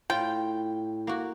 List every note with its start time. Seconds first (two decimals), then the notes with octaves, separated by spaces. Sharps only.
0.10 A2 F4 G5
1.07 A#3 F#4